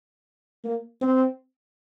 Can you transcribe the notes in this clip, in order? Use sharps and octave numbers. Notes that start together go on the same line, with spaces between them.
A#3
C4